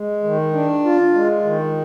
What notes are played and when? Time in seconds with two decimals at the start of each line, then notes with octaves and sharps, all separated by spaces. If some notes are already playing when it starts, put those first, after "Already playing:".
Already playing: G#3
0.24 D#3
0.54 D4
0.84 F4
1.14 G#3
1.45 D#3